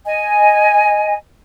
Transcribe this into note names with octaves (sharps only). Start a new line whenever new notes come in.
D#5 G#5